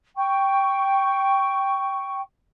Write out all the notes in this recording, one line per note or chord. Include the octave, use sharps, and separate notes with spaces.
G5 C#6